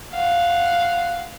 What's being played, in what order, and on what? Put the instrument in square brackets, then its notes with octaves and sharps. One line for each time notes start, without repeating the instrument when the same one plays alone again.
[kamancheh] F5 F#5